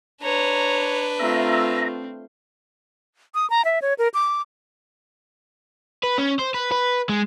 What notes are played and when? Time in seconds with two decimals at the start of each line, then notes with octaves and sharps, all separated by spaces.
0.23 D4 B4 C#5 A#5
1.19 A3 C4 F4 E5 A#5
3.35 D#6
3.50 A#5
3.65 E5
3.82 C#5
3.99 A#4
4.14 D6
6.03 B4
6.18 C#4
6.39 C5
6.54 B4
6.72 B4
7.09 G#3